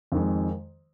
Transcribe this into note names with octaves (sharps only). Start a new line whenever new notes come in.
F2 D#3 G#3